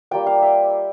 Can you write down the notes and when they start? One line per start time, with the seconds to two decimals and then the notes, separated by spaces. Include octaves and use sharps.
0.11 G3 A#3 F4 G5
0.27 F5
0.42 E5